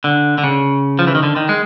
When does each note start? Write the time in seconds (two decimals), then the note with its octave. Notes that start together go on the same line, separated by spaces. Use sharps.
0.04 D3
0.38 D3
0.44 C#3
0.99 F3
1.07 E3
1.15 D#3
1.23 D3
1.36 D#3
1.49 G#3